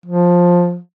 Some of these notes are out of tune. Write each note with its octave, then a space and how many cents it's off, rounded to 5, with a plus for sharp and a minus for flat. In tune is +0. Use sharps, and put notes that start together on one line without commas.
F3 +10